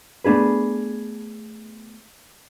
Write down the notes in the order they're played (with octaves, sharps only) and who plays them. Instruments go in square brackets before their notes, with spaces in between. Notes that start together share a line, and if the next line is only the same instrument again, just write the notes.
[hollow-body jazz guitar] A3 B3 D4 G#4 B4